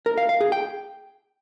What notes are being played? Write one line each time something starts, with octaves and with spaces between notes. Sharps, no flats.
A#4
F5
F5
G#4
G5